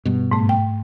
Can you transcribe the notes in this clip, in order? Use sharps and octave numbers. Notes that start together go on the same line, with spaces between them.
G2 B2
G#2 A3
G5